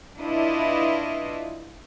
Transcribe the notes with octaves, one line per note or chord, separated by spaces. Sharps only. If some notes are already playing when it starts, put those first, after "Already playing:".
D4 E4 F4 B4 D#5